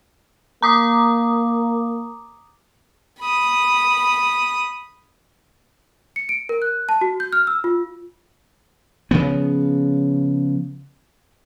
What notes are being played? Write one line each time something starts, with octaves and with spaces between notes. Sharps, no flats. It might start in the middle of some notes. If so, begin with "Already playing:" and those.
A#3 A#5 D6 D#6
B5 D#6
C#7
D7
A#4
F#6
A5
F#4
G6
F6
E6
F4
C#3 F3 B3